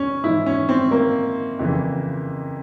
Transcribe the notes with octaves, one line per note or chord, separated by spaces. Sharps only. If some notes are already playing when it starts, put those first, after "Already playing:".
Already playing: C#4
G#2 E3 E4
C#4
C4
A#3
F2 C#3 E3